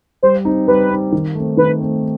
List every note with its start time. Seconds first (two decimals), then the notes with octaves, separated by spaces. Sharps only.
0.23 G3 C5
0.45 C4 D#4
0.67 G3 B4
0.90 C4 D#4
1.12 D#3
1.35 A3 C4
1.57 D#3 B4
1.81 A3 C4